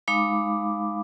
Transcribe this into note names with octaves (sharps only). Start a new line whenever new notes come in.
G#3 D#4 F5 B5 D6